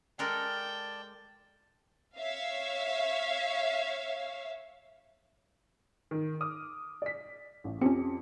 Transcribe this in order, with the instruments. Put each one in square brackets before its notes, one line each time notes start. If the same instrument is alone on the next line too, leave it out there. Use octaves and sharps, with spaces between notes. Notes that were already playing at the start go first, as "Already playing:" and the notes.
[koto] G#3 A4 A#4 [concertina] D5 A5 [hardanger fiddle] G5
[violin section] C#5 E5 F5
[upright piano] D#3
D6 D#6 F6
D5 B6
A1
[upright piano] F2 G4 C#7 [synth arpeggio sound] C4 C#4